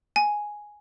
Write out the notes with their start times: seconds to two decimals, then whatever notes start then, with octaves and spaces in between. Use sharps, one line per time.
0.16 G#5